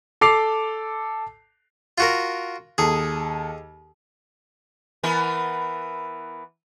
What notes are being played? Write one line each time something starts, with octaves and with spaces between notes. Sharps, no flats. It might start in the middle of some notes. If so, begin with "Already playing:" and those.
A4 D6 C7 F7
F4 F#4 A#4
D#2 G#4 A4
E3 B3 A#4